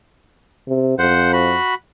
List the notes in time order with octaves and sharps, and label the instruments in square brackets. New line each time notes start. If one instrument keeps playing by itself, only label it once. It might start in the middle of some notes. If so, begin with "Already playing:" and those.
[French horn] C3
[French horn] F2 [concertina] C5 F#5
[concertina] F#4 B5